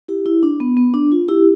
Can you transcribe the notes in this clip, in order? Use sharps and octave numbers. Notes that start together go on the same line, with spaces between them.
E4 G4
E4
D4
B3
B3
D4
F4
E4 G4